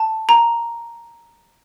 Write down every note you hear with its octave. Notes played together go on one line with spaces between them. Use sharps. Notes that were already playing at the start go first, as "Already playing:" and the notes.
Already playing: A5
A#5